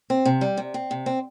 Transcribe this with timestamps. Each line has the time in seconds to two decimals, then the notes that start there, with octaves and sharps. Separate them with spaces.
0.10 C4
0.25 C3
0.41 G3
0.57 C3
0.74 C4
0.91 C3
1.06 C4